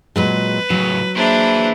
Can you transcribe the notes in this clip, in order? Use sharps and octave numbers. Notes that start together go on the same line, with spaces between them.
A#2 F#3 G#3 B4
A2 C#3 F#3
A#3 D4 E4 G#4 B4 C5 E5